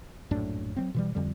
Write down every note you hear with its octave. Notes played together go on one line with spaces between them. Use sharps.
A#1 F#2 A2 D4
F#3 G#3 C4
B2 E3 G3
F2 D3 G3